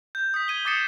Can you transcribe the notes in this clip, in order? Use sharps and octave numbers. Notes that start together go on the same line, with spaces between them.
G6
D#6 B6
G#6 D#7 G7
D6 D#6 A6 C7 C#7 E7